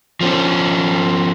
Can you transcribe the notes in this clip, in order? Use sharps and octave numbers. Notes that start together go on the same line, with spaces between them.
F3 C4 C#4